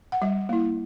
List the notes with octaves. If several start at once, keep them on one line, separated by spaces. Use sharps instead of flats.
F#5
G3 E5
A#3 E4